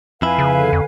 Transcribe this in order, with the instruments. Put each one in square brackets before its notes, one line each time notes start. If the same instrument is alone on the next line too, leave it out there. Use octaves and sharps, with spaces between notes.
[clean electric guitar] F2 E4 [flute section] B4 F5 G#5
[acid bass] C#3
[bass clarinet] D3
[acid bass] F2